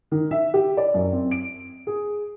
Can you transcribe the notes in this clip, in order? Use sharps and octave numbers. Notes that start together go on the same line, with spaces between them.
D#3
E5
G4
D5
F#2
C4
D7
G#4